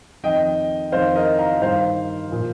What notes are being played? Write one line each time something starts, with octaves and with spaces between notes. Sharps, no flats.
F2 D#3 D#5 G5
F2 D#3 C5 F5
A#4 D#5
F5 A#5
G2 D#3 C5 F5
A#2 F3